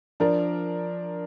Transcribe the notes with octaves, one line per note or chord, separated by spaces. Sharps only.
F3 D4 A#4 D5